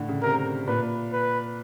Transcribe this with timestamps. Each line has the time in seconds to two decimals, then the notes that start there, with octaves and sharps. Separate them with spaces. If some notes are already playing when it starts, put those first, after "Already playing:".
Already playing: A2 D3
0.08 C#3
0.22 C3 A#4
0.67 A#2 B4
1.12 B4